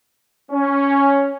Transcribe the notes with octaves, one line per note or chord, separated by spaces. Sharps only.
C#4